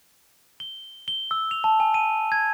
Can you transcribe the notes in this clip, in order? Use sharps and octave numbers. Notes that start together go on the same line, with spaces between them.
G7
G7
E6
F7
A5
G#5
D#7
G#6